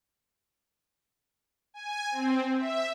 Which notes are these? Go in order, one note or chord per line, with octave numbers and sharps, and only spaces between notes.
G#5
C4
E5